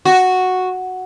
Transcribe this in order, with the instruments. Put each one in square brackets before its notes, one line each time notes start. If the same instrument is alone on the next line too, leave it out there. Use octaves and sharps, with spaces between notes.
[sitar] F#4